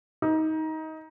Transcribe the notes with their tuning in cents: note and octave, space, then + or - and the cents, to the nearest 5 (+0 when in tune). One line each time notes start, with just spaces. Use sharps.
D#4 +20